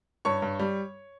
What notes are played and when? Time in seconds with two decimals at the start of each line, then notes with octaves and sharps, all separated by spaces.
0.25 G2 C#5 C#6
0.42 G2
0.60 G3